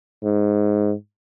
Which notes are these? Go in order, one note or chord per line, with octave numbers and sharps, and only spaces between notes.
G#2